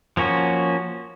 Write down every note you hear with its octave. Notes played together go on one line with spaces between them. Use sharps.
F3 A#3 C#4 F#4